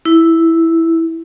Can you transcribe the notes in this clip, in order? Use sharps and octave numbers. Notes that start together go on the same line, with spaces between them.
E4